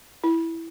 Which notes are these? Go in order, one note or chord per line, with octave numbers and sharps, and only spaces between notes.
E4